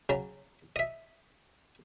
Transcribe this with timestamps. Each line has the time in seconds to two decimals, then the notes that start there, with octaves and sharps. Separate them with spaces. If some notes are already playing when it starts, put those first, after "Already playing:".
0.09 C#3 F#3
0.76 D#5 E5